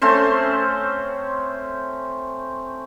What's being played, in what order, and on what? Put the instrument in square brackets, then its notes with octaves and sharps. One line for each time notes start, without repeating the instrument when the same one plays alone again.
[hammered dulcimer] A3 C4 C#4 C5